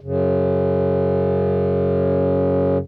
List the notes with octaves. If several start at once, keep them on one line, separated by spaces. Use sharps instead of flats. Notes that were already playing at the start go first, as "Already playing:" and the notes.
F#2 C#3